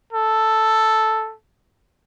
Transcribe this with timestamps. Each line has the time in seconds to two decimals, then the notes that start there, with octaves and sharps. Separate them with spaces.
0.13 A4